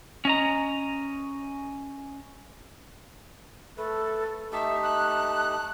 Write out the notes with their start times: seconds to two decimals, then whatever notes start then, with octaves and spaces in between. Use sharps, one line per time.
0.25 C#4 D#5 A#5
3.77 A3 A4 B4
4.52 A3 D#4 G4 E5 A5
4.83 F#6